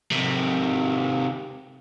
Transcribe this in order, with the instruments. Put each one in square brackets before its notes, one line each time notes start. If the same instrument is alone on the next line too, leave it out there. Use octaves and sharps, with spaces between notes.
[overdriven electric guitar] C3 D#3